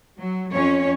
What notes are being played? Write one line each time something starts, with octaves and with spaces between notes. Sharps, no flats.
F#3
F2 C#4 C#5